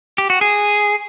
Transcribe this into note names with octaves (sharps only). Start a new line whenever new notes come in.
G4
F#4
G#4